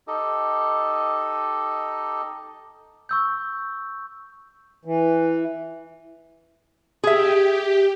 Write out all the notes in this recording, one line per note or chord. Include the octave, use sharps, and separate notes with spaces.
D#4 G4 A4 D#5
C#6 E6 G6
E3
G4 G#4 E5